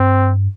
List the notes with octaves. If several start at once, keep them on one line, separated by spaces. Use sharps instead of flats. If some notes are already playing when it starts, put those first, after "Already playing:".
Already playing: G2 C4